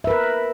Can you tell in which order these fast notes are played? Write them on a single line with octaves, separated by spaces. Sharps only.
E5 B4 A#4